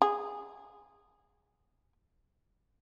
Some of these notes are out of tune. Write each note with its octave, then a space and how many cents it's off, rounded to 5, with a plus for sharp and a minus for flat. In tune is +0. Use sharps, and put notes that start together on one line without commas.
G#4 -10